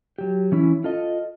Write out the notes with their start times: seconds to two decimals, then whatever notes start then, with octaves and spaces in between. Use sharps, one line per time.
0.18 F#3 G4
0.52 E3 C#4 E4
0.84 F4 A4 D#5